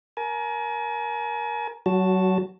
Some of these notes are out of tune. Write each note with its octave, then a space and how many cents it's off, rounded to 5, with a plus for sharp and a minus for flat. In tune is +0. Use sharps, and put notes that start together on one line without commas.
A#4 +15 G#5 +40
F#3 +25 F#4 -5 A5 +0